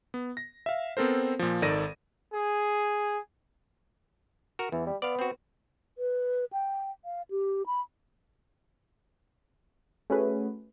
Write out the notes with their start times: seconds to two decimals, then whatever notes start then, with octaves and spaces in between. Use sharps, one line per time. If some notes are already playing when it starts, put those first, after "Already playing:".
0.14 B3
0.37 A#6
0.66 E5 F5
0.97 B3 C4 A4 A#4 C5
1.39 A#2 F3
1.62 G#1 D#3 A4 D5 A#6 D#7
2.33 G#4
4.59 F#4 A#4
4.72 E2 E3
4.87 G3
5.02 B3 D5 F5
5.19 C4 F#4
5.98 B4
6.53 G5
7.05 F5
7.30 G4
7.66 B5
10.10 A3 C#4 F#4 G#4 B4